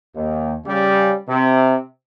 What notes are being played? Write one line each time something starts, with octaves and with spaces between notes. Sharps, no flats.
D#2
C#3 G3
C3